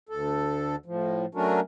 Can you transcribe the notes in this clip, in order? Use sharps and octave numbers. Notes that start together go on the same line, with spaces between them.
D2 A4
A2 F3
F#3 A3 C#4 D4 F#4 A#4